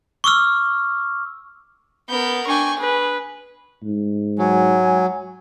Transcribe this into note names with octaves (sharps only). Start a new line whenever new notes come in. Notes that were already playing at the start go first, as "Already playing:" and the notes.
C#6 D6 E6 F6
B3 A#4 G6
D4 G5 G#5 C#6
G#4 B4
G#2
F#3 G#5